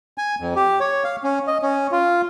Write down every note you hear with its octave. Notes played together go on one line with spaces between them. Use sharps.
G#5
F2
G4
C#5
F5
C#4
D#5
C#4
F4